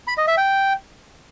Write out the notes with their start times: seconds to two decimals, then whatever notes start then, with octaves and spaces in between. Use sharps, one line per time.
0.08 B5
0.18 D#5
0.28 E5
0.38 G5